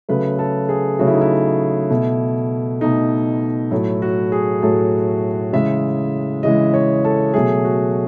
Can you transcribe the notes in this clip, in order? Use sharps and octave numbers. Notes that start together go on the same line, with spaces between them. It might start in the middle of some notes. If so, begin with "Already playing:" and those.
C#3 F#3 A3 B4
A4
G#4
C#3 F#3 A3 F#4
E4
D#4
E4
B2 A3
B2 A3 D#4
A2 F#3 A3 E4
F#4
G#4
A2 F#3 A3 A4
C#3 E3 G#3 E5
C#3 E3 G#3 D#5
C#5
A4
B2 F#3 A3 G#4
F#4